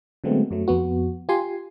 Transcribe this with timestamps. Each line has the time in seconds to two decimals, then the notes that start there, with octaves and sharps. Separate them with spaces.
0.24 D3 F#3 G#3 A3 B3 C4
0.51 F#2 F#3 A3
0.68 F2 B3 F#4
1.29 F4 G4 G#5 C6